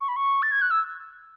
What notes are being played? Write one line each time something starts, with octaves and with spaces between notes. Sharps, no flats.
C#6
B5
C#6
A6
G#6
F#6
E6